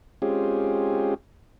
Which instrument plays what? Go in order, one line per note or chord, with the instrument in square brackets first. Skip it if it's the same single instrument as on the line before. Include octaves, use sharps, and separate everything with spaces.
[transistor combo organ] G#3 C4 C#4 F4 G4 G#4